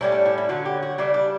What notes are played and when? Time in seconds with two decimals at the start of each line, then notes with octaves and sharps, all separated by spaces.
0.01 A2 G3 C#4 E4
0.12 D4
0.26 E4
0.38 E4
0.49 D3 F#3 C#4 F#4
0.65 G4
0.83 F#4
0.98 C#3 G3 D4 E4
1.14 D4